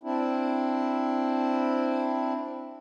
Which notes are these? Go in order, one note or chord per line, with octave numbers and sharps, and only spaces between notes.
C4 D4 E4